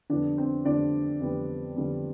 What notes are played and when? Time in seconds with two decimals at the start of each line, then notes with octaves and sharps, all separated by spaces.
0.10 F2 D3 G3 B3 D4 D5
0.38 C4 C5
0.65 F2 D3 G3 B3 D4 D5
1.20 F2 D3 G3 B3
1.76 F2 D3 G3 B3